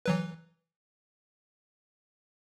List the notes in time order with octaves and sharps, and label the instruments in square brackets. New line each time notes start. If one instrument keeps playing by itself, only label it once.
[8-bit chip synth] E3 F#3 B4